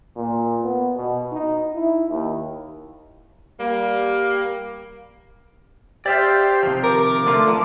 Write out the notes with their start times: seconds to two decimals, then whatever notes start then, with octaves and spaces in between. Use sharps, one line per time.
0.16 A#2
0.62 B3
0.96 B2
1.32 D#4
1.75 E4
2.10 D#2
3.60 G3 A#3
6.06 G4 C5 D5 E5 F5
6.63 C3 D#3 F3
6.83 A#4 D6
7.26 D3 A3 F4
7.48 D3 F3 A#4